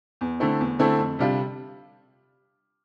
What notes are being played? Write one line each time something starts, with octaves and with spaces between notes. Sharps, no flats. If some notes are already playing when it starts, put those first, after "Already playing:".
E2
D3 A3 C4 E4
E2
D3 A3 C4 E4
F2
C3 G3 D4 F4